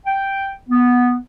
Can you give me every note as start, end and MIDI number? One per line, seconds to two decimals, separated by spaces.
0.06 0.50 79
0.69 1.16 59